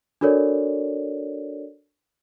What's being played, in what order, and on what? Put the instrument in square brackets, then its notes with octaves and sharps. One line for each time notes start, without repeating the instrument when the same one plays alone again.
[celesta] D4 F#4 A4 A#4 C#5 D5